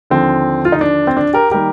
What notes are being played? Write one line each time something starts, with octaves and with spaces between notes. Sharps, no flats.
D#2 D3 F3 C4
F4
D#4
D4
C4
D4
G4 A#4
D#3 G3 A#3 G4 A#4